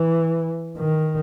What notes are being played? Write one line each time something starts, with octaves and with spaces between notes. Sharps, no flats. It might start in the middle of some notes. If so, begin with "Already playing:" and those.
Already playing: E3
D#3